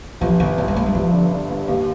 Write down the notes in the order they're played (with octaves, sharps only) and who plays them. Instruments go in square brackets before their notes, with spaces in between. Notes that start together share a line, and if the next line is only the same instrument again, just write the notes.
[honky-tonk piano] G1 [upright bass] F3
[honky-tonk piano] G1 [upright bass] D#3
[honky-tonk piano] G2 [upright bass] D#3
[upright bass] G#3
[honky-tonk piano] G1 [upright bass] A#3
[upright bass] G3
[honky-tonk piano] G2 [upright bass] F3
[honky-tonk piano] D3
D3
G1
[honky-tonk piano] D#2 [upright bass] D#3